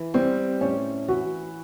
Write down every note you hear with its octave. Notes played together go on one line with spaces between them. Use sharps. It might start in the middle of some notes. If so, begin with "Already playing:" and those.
Already playing: E3
G3 C4
A2 C#4
E3 F#4